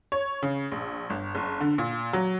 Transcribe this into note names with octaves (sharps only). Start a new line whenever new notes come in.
C#5
C#3
A#1
G1
F#1
D3
A#2
F#3